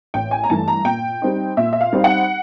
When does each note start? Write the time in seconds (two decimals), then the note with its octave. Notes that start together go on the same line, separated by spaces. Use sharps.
0.14 A1 G5
0.31 G#5
0.44 A#5
0.50 G2 E3 A3 A5
0.68 A#5
0.85 A#2 G5
1.22 G3 C4 D#4
1.57 A#2 E5
1.73 E5
1.81 F5
1.93 G3 C4 D#4
2.04 F#5